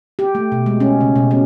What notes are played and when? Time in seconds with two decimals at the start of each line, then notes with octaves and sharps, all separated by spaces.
0.19 G4
0.35 A3
0.52 B2
0.66 G#3
0.80 C#4
1.01 C#3
1.16 B2
1.31 C#4